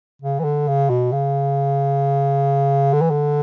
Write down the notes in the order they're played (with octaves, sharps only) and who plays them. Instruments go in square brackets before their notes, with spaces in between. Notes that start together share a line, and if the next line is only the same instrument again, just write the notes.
[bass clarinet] C#3
E3
D3
C#3
B2
C#3
D3
E3
D3